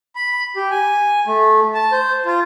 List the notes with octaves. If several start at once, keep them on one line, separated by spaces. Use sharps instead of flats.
B5
G4
G#5
A3
A5
C5
F4